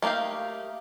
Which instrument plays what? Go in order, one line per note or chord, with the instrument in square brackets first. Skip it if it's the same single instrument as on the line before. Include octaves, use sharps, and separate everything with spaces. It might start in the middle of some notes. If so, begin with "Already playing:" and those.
[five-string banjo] A3 A#3 D#4 G4 F5